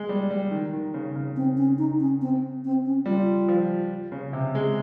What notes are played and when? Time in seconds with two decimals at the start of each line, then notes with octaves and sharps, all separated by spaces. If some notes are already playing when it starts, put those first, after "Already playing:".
Already playing: G#3
0.09 G3
0.30 G3
0.51 D#3
0.73 D#3
0.94 C#3
1.16 C#3
1.36 C4
1.57 C#4
1.78 D#4
2.00 C#4
2.21 C4
2.64 C4
2.86 C#4
3.06 G3 F4
3.48 F3
4.12 C#3
4.33 C3
4.55 G#3